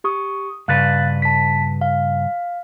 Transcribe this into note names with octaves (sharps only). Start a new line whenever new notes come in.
G4 C#6 D#6
G2 C#3 B4 F5 F#6 A6
A5 B6
F5